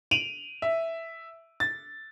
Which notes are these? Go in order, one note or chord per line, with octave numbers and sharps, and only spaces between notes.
D7 D#7 F7 F#7
E5
A6